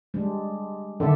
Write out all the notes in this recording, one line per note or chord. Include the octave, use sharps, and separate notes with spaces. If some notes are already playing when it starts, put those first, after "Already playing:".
G3 G#3 D4
D3 D#3 A4 D5 E5